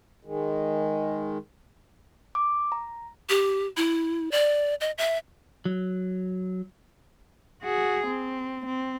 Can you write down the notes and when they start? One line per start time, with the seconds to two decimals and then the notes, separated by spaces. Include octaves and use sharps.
0.25 D#3 G#3
2.35 D6
2.72 A#5
3.29 G4
3.77 E4
4.31 D5
4.81 D#5
4.98 E5
5.65 F#3
7.62 F#4 G#4
8.07 C4
8.66 C4